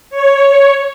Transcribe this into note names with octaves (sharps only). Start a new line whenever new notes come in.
C#5